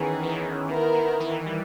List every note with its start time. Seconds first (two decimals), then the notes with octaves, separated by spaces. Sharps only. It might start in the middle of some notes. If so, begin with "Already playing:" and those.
Already playing: D#3 E3 B3 C#4 D#4 G#4
0.23 E3
0.29 D#3
0.68 D#3 B3 E4 A#4
0.94 D#3
1.20 E3
1.46 G3